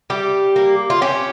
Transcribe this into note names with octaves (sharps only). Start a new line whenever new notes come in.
G3 G4
A#3
F4
C#4 G4